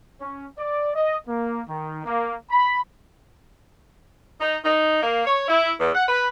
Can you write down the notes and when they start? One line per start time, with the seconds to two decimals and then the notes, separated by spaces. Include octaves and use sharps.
0.20 C#4
0.58 D5
0.95 D#5
1.28 A#3
1.68 D#3
2.03 A#3
2.50 B5
4.40 D#4
4.64 D#4
5.03 A#3
5.26 C#5
5.48 E4
5.79 E2
5.95 F#5
6.08 B4